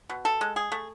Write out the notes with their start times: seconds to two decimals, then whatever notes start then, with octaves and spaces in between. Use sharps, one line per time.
0.10 B2
0.25 A4
0.41 G#3
0.56 G#4
0.72 A3